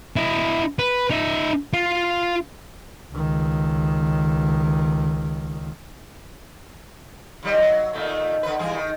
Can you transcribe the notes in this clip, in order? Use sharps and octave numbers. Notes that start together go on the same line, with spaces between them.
E4 D#5
B4
D#4 E5
F4
C#2 D#3
D#2 G3 D#5
F#3
A#2 D#3 A3
D3 B4
G2 E3 G#4
D#3